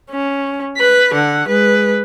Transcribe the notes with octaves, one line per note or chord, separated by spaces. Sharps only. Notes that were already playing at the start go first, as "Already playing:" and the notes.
C#4
B4 B5
D3 F#5
G#3 B4